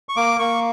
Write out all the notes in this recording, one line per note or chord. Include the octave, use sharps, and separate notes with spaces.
C#6
A#3 D6
A#3 C#6